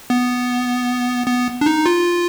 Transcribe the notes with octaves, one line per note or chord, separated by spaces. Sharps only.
B3
B3
D4
D#4
F4